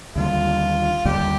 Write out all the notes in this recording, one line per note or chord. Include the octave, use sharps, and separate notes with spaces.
D#2 D3 G3 F4
D#2 D3 G3 G4